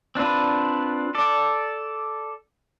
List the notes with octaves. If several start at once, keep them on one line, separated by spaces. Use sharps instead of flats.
C4 D4 F4 B4
A4 D5